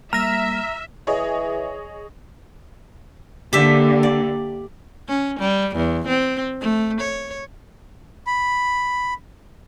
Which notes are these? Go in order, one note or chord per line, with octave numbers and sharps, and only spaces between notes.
G3 A#3 E5 A#5 F6 A#6
E3 G#4 C#5 D#5
D3 A#3 G4 E5
D5
C#4
G3
E2
C4
A3
C#5
B5